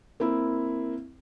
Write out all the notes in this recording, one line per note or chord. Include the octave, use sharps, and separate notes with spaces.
A#3 C4 E4